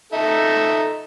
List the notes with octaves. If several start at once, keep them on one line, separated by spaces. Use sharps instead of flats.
D#4 A4 E5